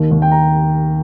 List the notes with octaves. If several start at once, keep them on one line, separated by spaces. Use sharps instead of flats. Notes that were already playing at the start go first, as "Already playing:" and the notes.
Already playing: D#2 D#3
D#2
G5
A#5